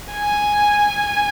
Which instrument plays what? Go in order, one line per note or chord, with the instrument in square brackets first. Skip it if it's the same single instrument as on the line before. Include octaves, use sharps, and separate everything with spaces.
[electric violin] G#5